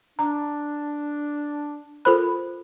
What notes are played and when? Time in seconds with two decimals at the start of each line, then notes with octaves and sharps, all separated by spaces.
0.19 D4 A#5
2.05 F4 A4 A#4 C5 B5 F#6